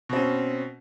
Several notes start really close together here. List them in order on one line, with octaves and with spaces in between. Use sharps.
B2 C4 C#4